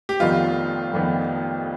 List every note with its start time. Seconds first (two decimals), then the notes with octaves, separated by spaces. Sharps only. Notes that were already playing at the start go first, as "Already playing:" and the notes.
0.09 G4
0.20 F1 F2 D#3 B3 D#4 F4
0.93 F1 F2 D#3 B3 D#4